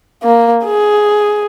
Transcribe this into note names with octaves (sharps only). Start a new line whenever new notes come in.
A#3
G#4